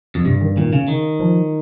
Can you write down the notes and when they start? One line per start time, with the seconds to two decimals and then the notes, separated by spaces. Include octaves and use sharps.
0.15 F2
0.25 G2 C3
0.41 D#3
0.57 A#2 D#3
0.73 C#3
0.88 D#3
1.20 F3